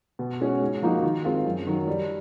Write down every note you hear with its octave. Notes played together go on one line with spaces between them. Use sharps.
B2
G#3 C#4 F#4
G#2
F3 A#3 D#4 F#4
D#3
G#3 C4 F4 A#4
F#2
D#3 F#3
G3